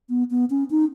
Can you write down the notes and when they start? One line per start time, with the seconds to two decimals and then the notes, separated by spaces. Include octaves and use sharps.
0.09 B3
0.31 B3
0.50 C#4
0.70 D#4